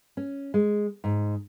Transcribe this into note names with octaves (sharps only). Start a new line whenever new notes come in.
C#4
G#3
G#2